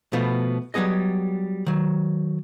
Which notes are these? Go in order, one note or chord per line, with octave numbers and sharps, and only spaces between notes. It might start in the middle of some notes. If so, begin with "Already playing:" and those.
B2 F3 A3 B3
F#3 G3 B3 G#4 D#5
D#3 F#3